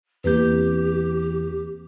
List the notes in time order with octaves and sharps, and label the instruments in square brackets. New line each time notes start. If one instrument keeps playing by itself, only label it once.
[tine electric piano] E2 E3 G6 [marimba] A#3 C4 B4 [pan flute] G4